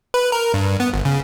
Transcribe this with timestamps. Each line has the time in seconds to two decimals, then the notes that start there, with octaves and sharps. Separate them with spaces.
0.14 B4
0.32 A#4
0.54 G2
0.80 B3
0.94 G1
1.05 C#3